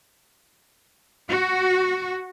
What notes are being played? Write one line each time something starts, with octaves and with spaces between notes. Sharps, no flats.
F#4